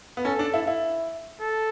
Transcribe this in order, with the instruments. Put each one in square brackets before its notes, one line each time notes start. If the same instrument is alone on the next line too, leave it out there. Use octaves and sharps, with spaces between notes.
[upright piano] B3
[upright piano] C#4 [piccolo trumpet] A4
[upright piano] D4
E4
E4
[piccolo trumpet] A4